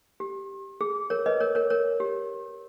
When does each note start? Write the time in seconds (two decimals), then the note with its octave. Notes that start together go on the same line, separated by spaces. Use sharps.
0.20 G4
0.81 G#4
1.10 A#4 C#5
1.26 B4 D#5
1.40 A#4 C#5
1.55 A#4 C#5
1.70 A#4 C#5
2.00 G4